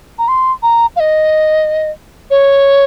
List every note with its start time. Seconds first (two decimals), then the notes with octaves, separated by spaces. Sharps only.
0.19 A#5
0.28 C6
0.63 A#5
0.96 F5
1.00 D#5
2.30 C#5